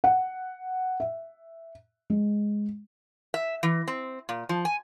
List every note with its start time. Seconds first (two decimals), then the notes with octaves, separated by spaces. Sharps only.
0.04 F#5
1.00 E5
2.10 G#3
3.34 E5
3.63 E3
3.88 C4
4.29 A#2
4.49 F3
4.65 G#5